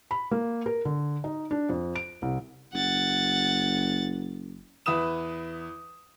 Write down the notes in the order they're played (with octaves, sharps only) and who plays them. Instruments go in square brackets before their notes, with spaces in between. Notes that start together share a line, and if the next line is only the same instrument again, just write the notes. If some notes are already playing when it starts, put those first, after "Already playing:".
[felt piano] B5
A#3
A#4
D3
D#4
D4
F2
D7
C2
[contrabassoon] F#1 [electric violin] F#5 A6
[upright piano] E2 E4 B4 D#6 E7